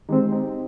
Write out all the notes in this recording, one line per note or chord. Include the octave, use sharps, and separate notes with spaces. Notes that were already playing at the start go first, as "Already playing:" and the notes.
D#3 G#3 C4 D#4 G4
C4 D#4